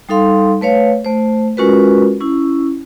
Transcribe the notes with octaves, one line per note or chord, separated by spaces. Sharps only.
G3 D#4 A4 F5 C6
A3 B4 C#5 F5
A3 C5
G#3 C#4 F4 F#4 A#4 B4
C#4 E4